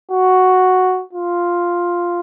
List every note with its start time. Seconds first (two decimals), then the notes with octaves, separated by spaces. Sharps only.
0.11 F#4
1.13 F4